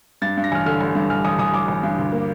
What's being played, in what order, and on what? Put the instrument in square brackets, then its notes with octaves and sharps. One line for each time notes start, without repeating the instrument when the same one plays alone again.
[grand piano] G2 A6
G2
A#6
A1 F6
D3 F6
A1
G2
A1 F6
A1 D#6
A1 D#6
A1 D6
A1
G2
D2
A#3